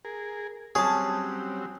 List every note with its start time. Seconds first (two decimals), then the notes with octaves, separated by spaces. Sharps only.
0.05 G#4 A#4
0.75 F#3 G3 C4 C#4 G#4 A5